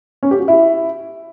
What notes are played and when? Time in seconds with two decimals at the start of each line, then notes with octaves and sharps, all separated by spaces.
0.23 C#4
0.31 G4
0.39 F#4
0.48 E4